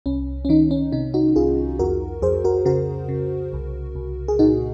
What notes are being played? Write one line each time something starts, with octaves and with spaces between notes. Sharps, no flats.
C2 C#4
C#4
D#3 D#4
C#4
C3 D#4
D#4 F#4
C2 F4 G#4
F2 F#4 A#4
F2 G#4 C5
F#4 A#4
C#3 F#4 A#4
C#3
C2
C2
G#4
A#2 D#4 F#4